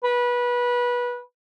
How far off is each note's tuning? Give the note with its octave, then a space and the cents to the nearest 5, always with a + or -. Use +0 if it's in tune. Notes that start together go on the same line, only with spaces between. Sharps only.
B4 -20